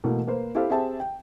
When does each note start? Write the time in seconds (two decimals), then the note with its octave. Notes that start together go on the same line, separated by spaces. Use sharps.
0.04 B2 E3 A3 A#3
0.27 A#3 B4 C5
0.55 E4 G4 A4 C5 F5
0.70 C4 G4 G#4 E5 G5 A5
1.00 G5